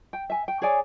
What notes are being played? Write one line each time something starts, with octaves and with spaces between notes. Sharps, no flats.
G5
E5 G#5
G5
G#4 C#5 D5 G#5